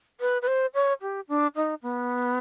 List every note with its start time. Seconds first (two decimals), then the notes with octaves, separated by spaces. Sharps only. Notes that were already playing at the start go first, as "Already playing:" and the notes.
0.20 B4
0.42 B4
0.47 C5
0.74 C#5
1.02 G4
1.29 D4
1.56 D#4
1.83 B3